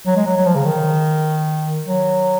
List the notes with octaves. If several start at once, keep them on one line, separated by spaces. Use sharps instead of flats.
F#3
G#3
F#3
F#3
F3
C#3
D#3
F#3